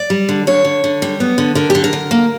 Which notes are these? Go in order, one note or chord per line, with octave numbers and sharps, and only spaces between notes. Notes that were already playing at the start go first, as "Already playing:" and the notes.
Already playing: D5
G3
D3
D3 C#5
D3
D3
G3
B3
D3
D3 A#4
D3 G4
A#4
D3
A#3